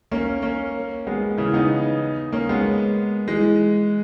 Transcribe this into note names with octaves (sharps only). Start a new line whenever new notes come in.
A#3 C#4
A#3 C#4
G#3 B3
C#3 E3
B3 D#4
A#3 C#4
G#3 B3
E3 G#3